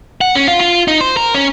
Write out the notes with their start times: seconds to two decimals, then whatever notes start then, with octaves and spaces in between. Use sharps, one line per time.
0.21 F#5
0.35 C#4
0.47 F4
0.61 F4
0.88 D#4
1.01 C5
1.17 A#4
1.35 C#4